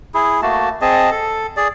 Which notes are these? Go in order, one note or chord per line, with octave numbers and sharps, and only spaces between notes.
E4 G#4
A3 A#3 F#4 A5
C4 G#4 D#5 A5
A4
G#4 D5